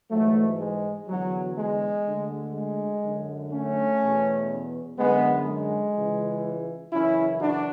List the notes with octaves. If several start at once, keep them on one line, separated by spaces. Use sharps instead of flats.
G#2 E3 F#3 A3
G#3
E2 D3 F#3
G#3
D2 D3
G#3
F#2 D3
A3 C#4
E2 B2
F#2 D3 G#3 B3
G#3
C#2 C#3 E3
F#2 C#3 E3 C#4 E4
D4 F#4